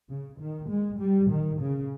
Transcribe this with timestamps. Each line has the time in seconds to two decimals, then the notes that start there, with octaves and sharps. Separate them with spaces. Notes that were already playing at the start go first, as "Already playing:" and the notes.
0.09 C#3
0.40 D#3
0.70 G#3
1.00 G3
1.30 D#3
1.61 C#3